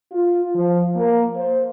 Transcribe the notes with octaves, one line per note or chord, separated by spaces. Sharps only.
F4
F3
A#3
C5